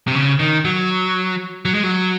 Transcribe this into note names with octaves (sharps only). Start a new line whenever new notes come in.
C3
C#3
D#3
F#3
F#3
G#3
F#3